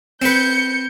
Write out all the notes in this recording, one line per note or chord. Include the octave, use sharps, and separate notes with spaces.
C4 B4 G6 C#7